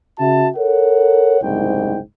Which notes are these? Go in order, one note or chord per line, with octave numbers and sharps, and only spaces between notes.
C#3 F#4 E5 A5
A4 A#4 C#5 F#5
F#1 C2 G#2 G5